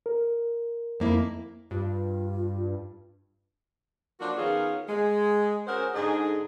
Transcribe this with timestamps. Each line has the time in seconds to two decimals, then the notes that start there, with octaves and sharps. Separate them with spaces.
0.06 A#4
1.00 F2 A#3 E4
1.71 G2 F4
4.20 F3 F#3 A#3 D4 F#4
4.38 D#3 B3 C#4 F4 G#4 A#4
4.89 G#3
5.67 C#4 F#4 G#4 A#4 C5
5.95 G#2 D3 D#4 G#4